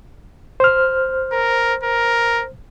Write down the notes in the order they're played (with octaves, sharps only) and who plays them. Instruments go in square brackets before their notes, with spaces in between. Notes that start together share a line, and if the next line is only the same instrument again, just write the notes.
[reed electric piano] C5 F6
[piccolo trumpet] A#4
A#4